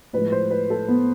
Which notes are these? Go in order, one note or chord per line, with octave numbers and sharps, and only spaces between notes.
A2 F3 G#3 B4
C5
B4
A4
B3